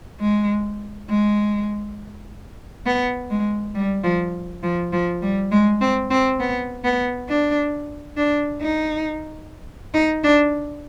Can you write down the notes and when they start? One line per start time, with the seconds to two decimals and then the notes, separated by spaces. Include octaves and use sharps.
0.20 G#3
1.09 G#3
2.86 B3
3.30 G#3
3.75 G3
4.04 F3
4.63 F3
4.93 F3
5.22 G3
5.51 G#3
5.81 C4
6.10 C4
6.40 B3
6.84 B3
7.28 D4
8.17 D4
8.61 D#4
9.94 D#4
10.23 D4